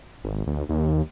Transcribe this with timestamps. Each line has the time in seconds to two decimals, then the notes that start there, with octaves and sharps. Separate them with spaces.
0.24 G#1
0.47 D2
0.69 D#2